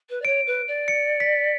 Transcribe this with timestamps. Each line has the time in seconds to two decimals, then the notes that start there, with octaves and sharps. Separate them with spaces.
0.09 B4
0.21 D5
0.25 C#5 D7
0.47 B4
0.67 D5
0.88 C#7
1.20 B6